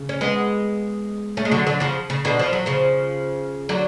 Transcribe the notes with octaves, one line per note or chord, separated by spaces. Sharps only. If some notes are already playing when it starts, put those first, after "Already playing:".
Already playing: C#3
C#4
G#3 B3
A3 C#4
G#3
D3 F#3
D3 F#3
C#3 F3
C#3
B2 D3
F3
F#3
C#3 F3
D3 F#3